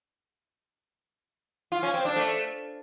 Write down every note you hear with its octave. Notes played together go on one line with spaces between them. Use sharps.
F4
C#4
C4
D4
A3